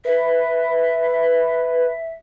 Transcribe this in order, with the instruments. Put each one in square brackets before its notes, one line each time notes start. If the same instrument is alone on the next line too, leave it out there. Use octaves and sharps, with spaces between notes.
[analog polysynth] B4 [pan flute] E5